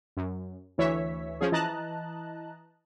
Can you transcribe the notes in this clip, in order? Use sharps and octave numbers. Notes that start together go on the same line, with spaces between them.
F#2
D2 E3 C#5 E5 B6
F3 C#4 G#4
E3 D#5 A5 A#5 F#6